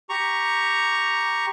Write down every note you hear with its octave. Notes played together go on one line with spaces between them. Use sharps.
G4 A#5 C#6